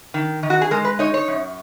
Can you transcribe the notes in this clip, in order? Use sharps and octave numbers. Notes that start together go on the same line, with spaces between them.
D#3
D#3
F#4
G#4
G#3 A#4
B4
D#4 C#5
C#5
F#2